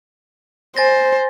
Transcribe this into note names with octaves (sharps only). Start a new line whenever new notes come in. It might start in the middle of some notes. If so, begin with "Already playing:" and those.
C5 G#5 A6 A#6